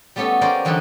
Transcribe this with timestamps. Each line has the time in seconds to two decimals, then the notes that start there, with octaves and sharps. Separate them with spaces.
0.16 G3 A3 B3 C#4 G4 A4
0.41 A#3 C#4 F4 A#4 C5 D5
0.65 E2 D3 F#3 G3 D4 D#4